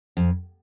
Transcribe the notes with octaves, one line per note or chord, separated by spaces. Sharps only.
F2